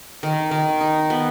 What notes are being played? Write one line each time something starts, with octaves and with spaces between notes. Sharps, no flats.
D#3
D#3
D#4
B3